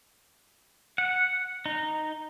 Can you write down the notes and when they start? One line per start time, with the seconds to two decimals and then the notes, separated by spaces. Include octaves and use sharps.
0.98 F#5
1.66 D#4